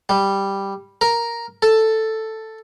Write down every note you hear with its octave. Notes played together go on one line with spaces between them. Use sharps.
G3
A#4
A4